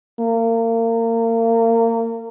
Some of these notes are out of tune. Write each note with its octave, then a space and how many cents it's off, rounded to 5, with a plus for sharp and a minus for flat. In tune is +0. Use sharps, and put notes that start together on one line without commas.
A#3 -30